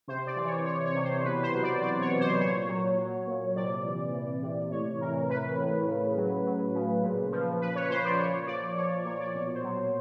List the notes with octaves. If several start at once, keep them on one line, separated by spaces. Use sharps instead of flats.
C3 C5
D5
E3
C#5
E3 C#5
C#5
C3
C5
B2 B4
C5
F#3
D5
F#3 D5
C#5
B2
C5
A#2 C#5
F#3
F#3
A#2
C3 D5
E3
E3
C3
A2 C#5
E3 A#4
E3 B4
A2
C#3
F#3
F#3
C#3
A#2
F3
F3 B4
C#5
B4
A#2 C5
D5
A#2 C#5
F3 D5
F3 C#5
D5
A#2 C#5
D5
B2 C#5
C5
F#3